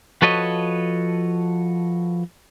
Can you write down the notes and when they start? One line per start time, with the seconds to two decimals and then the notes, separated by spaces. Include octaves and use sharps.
0.22 F3 F#4 A4 B4 C#5 D#5